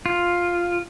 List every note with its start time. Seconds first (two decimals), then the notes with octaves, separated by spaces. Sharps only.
0.06 F4